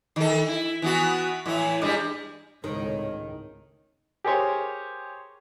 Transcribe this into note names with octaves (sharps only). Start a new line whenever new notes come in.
D#3 A4
E4
E3 B3 F#4
A2 E3 E4
G2 G3 G#3
G#1 C#2 A2 D#3 C#5
G4 G#4 A#4 C5 C#5